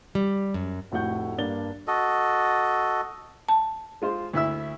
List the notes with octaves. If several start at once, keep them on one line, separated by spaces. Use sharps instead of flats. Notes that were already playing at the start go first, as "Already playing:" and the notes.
G3
F#2
F1 A2 F#4 F#5 G6
G2 A#3 D4 A6 G7
F#4 A4 D#5
A5
G#3 F4 C5
D2 E4 E5 E6